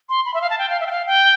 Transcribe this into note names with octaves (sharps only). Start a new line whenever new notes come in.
C6
B5
E5
F5
A5
G5
F5
E5
G5
F5
G5